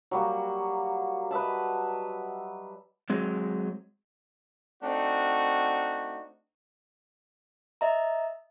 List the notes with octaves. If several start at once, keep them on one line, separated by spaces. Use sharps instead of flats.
F#3 G3 A#3
B4 D#5 E5 A5
F#3 G#3 C4
A3 C4 D4 D#4 F#4
D#5 E5 A#5